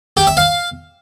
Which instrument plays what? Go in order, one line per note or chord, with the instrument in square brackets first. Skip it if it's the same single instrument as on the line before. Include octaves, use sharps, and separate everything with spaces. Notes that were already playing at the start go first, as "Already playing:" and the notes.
[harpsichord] G4
E5
F5